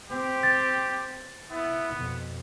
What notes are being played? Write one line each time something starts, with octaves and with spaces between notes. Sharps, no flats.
C4 G4
A6
B3 E4
F2 B2